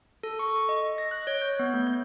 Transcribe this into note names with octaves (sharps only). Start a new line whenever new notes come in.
A4
C#6
D#5
A#6
F#6
C#5
G6
B3
A3
G6